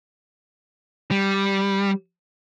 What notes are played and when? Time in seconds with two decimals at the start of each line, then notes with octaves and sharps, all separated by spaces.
1.11 G3